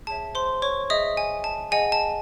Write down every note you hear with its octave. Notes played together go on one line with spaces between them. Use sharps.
G#4 C#5 E5 A5
C5 C6
C#5 C#6
G#4 C#5 D#5 E5 D#6
G#5
A5
G#4 D#5 F#5 G#5
A5